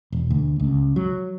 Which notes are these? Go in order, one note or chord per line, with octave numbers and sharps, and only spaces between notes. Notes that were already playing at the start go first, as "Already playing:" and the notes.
E1
D2
C#2
F#3